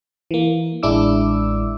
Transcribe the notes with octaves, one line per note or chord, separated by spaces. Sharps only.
E3 A#3
A1 G#3 D4 E4 D6 E6